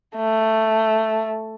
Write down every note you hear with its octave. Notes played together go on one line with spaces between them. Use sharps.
A3